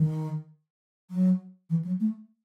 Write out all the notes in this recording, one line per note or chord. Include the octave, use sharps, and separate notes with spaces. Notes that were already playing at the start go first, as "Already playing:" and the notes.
Already playing: D#3
F#3
E3
F#3
A3